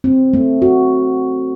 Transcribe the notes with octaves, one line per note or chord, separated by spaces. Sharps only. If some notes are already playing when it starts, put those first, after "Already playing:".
C4
A3
F#4